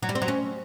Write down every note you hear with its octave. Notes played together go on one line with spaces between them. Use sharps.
F#3
G3
C4
F#3
C#4